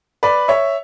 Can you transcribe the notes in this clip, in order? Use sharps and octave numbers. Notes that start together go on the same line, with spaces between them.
B4 D5
C#5 E5